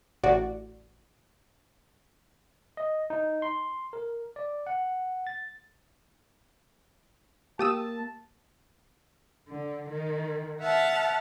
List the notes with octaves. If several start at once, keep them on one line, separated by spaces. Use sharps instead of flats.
A1 F#4 D5
D#5
D#4
C6
A#4
D5
F#5
A6
A#3 G4 A5 D#6 E6
D3
D#3
E5 F#5 A5 F6